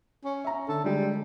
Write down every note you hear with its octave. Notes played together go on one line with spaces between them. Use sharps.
C#4
E5 A#5
D3 A4
D3 G3 G#3